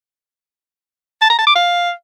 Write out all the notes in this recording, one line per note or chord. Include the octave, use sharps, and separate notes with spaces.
A5
A#5
A5
D6
F5